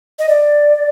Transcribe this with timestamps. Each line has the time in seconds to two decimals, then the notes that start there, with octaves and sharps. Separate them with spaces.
0.19 D#5
0.29 D5